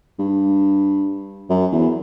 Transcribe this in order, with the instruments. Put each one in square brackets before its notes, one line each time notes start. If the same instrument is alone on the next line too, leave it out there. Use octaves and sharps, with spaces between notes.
[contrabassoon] G2
F#2
E2